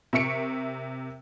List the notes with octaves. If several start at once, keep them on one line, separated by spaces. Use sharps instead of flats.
C3 A#4 E5 C#6 C#7 D7